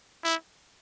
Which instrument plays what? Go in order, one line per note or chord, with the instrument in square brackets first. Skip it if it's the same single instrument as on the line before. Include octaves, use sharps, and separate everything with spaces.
[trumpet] E4